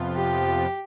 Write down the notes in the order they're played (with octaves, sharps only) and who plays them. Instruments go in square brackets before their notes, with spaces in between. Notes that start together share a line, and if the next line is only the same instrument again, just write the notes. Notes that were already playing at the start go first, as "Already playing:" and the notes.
Already playing: [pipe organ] F2 C3 F3 B3 F4
[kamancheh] G4